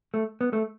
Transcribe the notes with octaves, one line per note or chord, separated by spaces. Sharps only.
A3
B3
A3